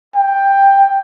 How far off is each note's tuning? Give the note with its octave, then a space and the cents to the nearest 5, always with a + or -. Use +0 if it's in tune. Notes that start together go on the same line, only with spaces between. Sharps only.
G5 +10